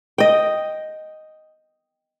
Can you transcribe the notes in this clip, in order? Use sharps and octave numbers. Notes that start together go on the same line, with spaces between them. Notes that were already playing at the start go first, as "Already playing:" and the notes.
D#5 G5